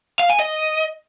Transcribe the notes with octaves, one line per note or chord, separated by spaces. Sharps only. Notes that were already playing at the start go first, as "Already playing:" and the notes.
F5
G#5
D#5